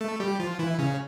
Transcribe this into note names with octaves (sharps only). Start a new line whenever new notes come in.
A3 A4
G3 G4
F3 F4
E3 E4
C#3 C#4